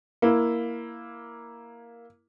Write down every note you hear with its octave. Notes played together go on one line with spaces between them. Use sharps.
A#3 E4